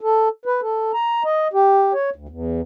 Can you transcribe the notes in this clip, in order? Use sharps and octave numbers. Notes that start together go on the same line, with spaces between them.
A4
B4
A4
A#5
D#5
G4
C#5
D2
E2